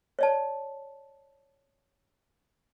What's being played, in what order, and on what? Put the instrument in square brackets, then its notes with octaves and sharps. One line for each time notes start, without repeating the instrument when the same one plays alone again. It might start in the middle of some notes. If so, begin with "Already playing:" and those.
[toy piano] C#5 D5 A5